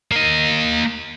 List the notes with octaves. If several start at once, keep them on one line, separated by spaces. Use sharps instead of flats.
A#3 D#5